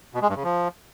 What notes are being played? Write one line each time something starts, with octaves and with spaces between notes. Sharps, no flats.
B2
G#3
G2
C#3
F3